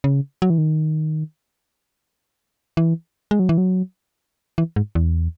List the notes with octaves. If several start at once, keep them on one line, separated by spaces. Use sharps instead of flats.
C#3
F#3
E3
D#3
E3
G#3
F#3
E3
F#3
E3
G#2
E2